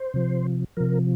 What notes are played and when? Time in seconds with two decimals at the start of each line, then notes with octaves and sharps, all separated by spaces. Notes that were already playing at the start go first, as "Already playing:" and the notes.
Already playing: C5
0.14 C3 F3
0.77 C3 F3 A#4